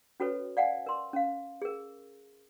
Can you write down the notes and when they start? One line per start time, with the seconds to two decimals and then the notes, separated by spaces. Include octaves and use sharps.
0.20 C#4 F#4 A4 B4 C#5
0.57 D5 F5 F#5 G#5
0.86 A#4 C6
1.13 C#4 F5
1.62 G#4 A#4